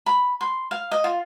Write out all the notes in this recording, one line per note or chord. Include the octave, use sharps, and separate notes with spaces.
B5
C6
F5
D#5
F4